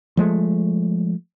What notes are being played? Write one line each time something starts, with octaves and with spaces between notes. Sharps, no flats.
F3 G#3 A3